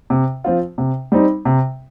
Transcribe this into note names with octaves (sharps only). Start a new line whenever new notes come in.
C3
F3 C4 F4
C3
G3 C4 D#4
C3